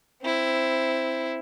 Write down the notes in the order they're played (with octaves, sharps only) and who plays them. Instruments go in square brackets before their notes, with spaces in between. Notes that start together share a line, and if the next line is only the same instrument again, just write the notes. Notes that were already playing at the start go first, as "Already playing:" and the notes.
[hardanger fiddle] C4 E4